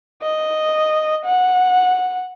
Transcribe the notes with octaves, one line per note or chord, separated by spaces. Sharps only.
D#5
F#5